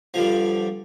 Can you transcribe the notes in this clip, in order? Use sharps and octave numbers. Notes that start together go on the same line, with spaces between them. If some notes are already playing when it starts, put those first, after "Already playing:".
G2 D3 F3